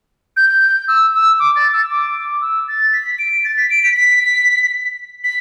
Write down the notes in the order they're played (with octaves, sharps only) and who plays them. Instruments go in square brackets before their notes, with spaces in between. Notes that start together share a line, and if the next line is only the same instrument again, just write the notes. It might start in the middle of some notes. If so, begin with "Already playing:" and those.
[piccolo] G6
E6
E6
D6
A6
E6
D6
E6
A6
B6
D7
A6
B6
D7
B6
B6
B6